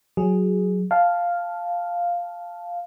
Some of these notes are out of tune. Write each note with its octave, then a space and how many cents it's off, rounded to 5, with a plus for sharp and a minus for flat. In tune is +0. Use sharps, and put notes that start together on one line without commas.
F#3 +0 G#4 +0
F5 +0 A5 -10